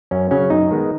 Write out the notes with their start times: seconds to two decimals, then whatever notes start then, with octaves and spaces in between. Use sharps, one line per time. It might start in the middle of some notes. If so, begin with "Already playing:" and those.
0.11 F#2 C#4
0.31 C#3 F#3 C#4
0.50 F#2 D#4
0.71 D#3 G#3 B3